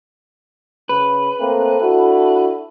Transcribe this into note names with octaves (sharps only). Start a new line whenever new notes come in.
C#3 B4
A3 A#3 C4 A4
D4 E4 F#4